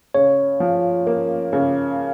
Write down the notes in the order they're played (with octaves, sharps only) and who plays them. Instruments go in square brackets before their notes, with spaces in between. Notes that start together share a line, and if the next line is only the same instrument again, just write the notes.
[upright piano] C#3 [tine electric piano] C#5
[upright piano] F3
A#3
C#3